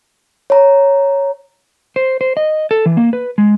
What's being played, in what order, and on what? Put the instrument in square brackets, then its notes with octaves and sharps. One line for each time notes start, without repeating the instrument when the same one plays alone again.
[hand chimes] C#5 A#5
[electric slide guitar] C5
C5
D#5
A4
E3
A#3
B4
G#3